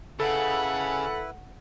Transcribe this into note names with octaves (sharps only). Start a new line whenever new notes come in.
C#3 E4 A4 B4 F#5